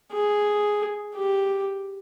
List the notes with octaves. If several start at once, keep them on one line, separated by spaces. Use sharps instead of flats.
G#4
G4